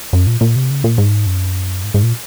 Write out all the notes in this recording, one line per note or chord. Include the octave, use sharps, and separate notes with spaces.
F#2
A#2
A#2
C3
C#3
A#2
G#2
F#2
G#2
G#2
A#2